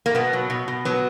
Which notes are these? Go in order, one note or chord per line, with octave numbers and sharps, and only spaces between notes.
A#3
B2 B3
F#3
B2
B2
F#3 B3